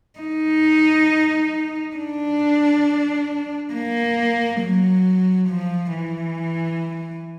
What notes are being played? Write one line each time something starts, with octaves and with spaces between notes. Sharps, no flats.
D#4
D4
A#3
F#3
F3
E3